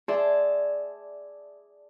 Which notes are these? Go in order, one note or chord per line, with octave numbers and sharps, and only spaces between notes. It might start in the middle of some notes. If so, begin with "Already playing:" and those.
G#4 D5 E5 A5 C6